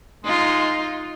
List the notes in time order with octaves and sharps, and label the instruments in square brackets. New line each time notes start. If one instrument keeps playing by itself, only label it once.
[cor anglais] G#3 [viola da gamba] D#4 F4